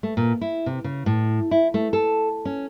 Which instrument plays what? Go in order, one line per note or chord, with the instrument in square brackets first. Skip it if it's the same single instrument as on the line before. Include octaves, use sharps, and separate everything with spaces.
[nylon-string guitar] A3
A#2
E4
C3
C#3
A2
E4
A3
A4
C#4